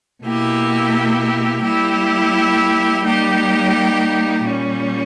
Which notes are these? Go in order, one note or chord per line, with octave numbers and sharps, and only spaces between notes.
B2 A#3 E4 G4
G3 A#3 E4 G4
G3 A#3 D#4 G4
A#2 G3 C#4